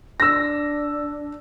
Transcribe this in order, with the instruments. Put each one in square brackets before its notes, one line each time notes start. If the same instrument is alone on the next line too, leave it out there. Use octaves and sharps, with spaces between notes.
[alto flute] D4 [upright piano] E6 A#6